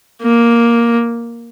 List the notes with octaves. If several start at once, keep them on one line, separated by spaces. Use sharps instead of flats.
A#3